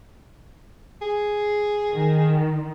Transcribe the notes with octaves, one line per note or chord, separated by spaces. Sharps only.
G#4
D#3